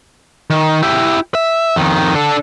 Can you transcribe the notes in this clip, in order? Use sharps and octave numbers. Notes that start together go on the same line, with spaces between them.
D#3
E4 G4
E5
F2 D#3
D4 A4